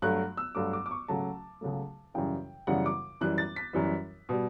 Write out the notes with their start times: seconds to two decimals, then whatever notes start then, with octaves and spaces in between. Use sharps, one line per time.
0.02 G2 F#3 A3 F#6
0.37 E6
0.55 G2 F#3 A3 D6
0.73 D6
0.86 D6
0.91 C#6
1.08 C#2 C#3 F#3 A3 A5
1.61 C#2 C#3 F#3 A3
2.14 F#2 C#3 E3 G3 G5
2.67 F#2 C#3 E3 G3 F#5
2.86 D6
3.21 F#2 E3 G3 F#6
3.38 A6
3.56 B6
3.73 F#2 E3 G3
4.29 B2 G3